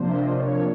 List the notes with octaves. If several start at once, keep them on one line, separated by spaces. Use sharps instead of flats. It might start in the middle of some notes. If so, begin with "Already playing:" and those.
Already playing: C3 F3 A#3 D4 C5
E5
D#5
D5
C#5